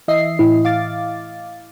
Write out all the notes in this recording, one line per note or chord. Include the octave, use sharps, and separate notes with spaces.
E3 D#5 E5 C7
A2 E4
F5 D6 A6